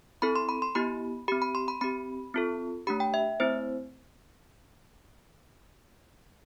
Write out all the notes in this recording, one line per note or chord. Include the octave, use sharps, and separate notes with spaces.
C4 E4 A4 B5
C6
B5
C6
B3 E4 G4 B5
C4 G4 B5
B5
C6
B5
C4 G4 B5
C4 F4 A4
A3 D4 G4 B5
G5
E5
A3 C4 E4 C5